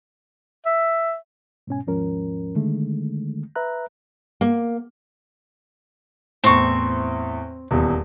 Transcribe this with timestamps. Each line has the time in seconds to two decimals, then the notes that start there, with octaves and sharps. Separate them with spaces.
0.66 E5
1.67 G#2 B2 C#4 G#5
1.87 D#2 G#2 F3 C#4 A#4
2.56 D3 D#3 G#3 A3
3.56 B4 E5 A#5 F#6
4.41 A#3
6.44 E2 A2 C4 C#6
7.71 D#1 E2